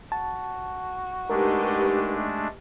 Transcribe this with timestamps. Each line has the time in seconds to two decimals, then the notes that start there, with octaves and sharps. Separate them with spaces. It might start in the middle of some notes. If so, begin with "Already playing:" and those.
0.12 F#4 A5
1.30 G#3 A3 D4 D#4 G4 A#4 B4